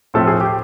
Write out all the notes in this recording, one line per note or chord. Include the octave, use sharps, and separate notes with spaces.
A2 F3 A3 C4 A4
G#4
G4